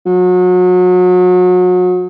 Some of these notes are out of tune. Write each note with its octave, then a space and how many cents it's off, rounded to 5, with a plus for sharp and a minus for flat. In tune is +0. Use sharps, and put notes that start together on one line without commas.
F#3 -35